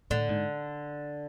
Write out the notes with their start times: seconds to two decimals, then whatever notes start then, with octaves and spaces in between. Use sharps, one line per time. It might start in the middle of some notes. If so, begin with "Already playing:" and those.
0.10 A2 D3
0.29 G#2